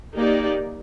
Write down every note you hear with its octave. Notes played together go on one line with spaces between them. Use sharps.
A#3 D#4 G4 D5